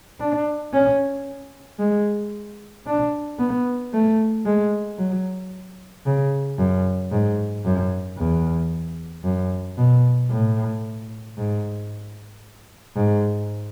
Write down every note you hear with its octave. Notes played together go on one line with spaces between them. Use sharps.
D4
C#4
G#3
D4
B3
A3
G#3
F#3
C#3
F#2
G#2
F#2
E2
F#2
B2
A2
G#2
G#2